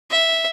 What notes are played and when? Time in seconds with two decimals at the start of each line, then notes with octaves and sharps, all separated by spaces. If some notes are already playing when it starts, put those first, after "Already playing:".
0.11 E5